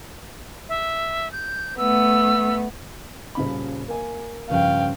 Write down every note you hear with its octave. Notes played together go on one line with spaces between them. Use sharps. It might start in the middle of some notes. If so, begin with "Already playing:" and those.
E5
G6
A3 B3 E6
D#1 C#3 B5
A#3 G#5
G2 C#3 F3 F5 G5